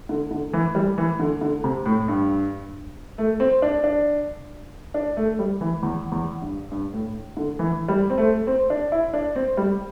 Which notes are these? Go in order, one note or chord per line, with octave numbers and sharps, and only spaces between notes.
D3
D3
E3
G3
E3
D3
D3
C3
A2
G2
A3
C4
D4
D4
D4
A3
G3
E3
E2
E2
G2
G2
A2
D3
E3
G3
C4
A3
C4
D4
E4
D4
C4
G3